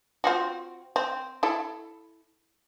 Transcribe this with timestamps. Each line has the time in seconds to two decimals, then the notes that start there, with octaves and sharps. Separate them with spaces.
0.24 C4 F4 F#4
0.96 C4
1.43 E4 A4